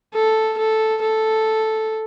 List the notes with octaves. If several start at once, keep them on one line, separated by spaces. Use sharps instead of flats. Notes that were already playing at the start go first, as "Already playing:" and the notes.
A4
A4
A4